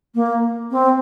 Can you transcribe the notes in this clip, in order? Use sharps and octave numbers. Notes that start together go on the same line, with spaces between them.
A#3
C4